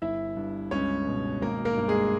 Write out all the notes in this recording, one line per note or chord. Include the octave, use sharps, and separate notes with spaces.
G1 E4 E5
G2
C#2 C#4 C#5
B2
G#1 A#3 A#4
A#3 A#4
G2
G#3 G#4